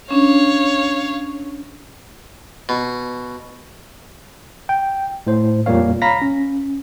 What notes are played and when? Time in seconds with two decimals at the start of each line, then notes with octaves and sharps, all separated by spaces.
0.11 C#4 D4 C#5 F5
2.69 B2
4.69 G5
5.27 A2 C5
5.66 F2 A#2 G3 A#3 C#5 F5
6.02 C#5 F5 A#5 B5 A#6 B6
6.22 C#4